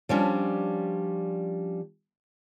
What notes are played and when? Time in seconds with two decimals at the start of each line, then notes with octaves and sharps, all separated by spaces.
0.09 F3 G3 C#4 D4